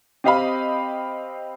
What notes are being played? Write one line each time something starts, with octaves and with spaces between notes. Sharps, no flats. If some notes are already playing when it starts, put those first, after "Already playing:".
C4 G4 D#5 F5 G5 B5